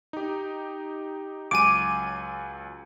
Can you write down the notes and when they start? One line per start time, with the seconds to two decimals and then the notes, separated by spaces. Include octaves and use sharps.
0.13 D#4 G4
1.51 C#2 F#3 G#5 D6 D#7